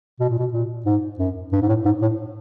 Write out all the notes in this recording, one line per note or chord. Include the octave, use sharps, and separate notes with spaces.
B2
A#2
B2
A#2
G#2
F#2
G2
G#2
A2
G#2
A2